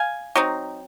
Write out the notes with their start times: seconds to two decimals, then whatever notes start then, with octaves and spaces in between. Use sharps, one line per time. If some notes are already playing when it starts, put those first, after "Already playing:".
Already playing: F5 G#5
0.36 F#3 C4 D#4